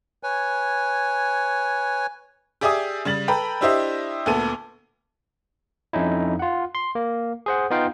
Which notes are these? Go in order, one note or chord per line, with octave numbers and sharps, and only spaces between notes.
B4 C#5 G#5
G4 G#4 D5 E5 G#5 D#6
C#3 G3 A6 F#7
A4 B4 G5 A#5 B5
D4 E4 G4 C5 D#5 E5
D2 A#2 B3 A4 D#7
F2 C#4 D#4 E4
F4 F#5
C6
A#3
G#4 C5 F#5
B3 D#4 F4 F5 G5